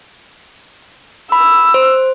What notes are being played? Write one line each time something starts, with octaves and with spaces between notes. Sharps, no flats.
B5 E6
C5